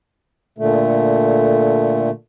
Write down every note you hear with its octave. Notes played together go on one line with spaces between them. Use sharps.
A#2 D3 A3